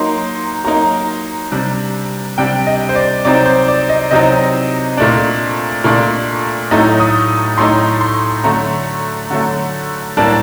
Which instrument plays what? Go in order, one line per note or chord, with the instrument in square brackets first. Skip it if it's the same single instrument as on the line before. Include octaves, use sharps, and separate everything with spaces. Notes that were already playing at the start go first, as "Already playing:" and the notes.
Already playing: [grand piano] F#3 A#3 D#4 C6
F#3 A#3 D#4 A#5
C3 G3 D4
C3 G3 D4 G5
D#5
C5
D5
C3 F#3 C4 D#4 D5
C5
D5
D#5
C3 F#3 C4 D#4 D#5
A#2 A3 D4
A#2 A3 D4
A2 F#3 A3 D#4
D#6
A2 F#3 A3 D#4 C6
C6
D3 F#3 A3 A#5
D3 F#3 A3
A2 G3 A#3 D4 A5